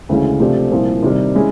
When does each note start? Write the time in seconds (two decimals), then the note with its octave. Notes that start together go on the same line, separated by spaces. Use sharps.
0.09 D2 C#3 E3 G#3 C#4
0.40 C3 F3 A3 D4 G4
0.71 C2 A#2 F3
1.03 C3 D#3 G3
1.35 E3 G#3 C#4 E4